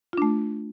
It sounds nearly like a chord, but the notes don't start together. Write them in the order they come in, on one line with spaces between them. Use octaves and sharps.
F4 D4 A3